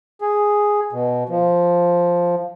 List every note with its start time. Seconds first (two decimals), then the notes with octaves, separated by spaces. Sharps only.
0.21 G#4
0.93 B2
1.29 F3